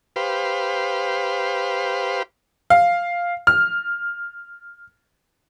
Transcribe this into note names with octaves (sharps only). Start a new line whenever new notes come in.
G4 B4 C5 F5
F5
F6